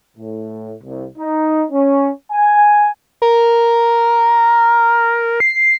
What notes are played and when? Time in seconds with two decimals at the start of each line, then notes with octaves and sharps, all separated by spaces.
0.17 A2
0.83 C2
1.18 D#4
1.71 C#4
2.32 G#5
3.22 A#4
5.40 C7